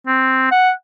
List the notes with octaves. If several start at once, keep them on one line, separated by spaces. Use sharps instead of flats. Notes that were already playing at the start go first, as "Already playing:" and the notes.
C4
F#5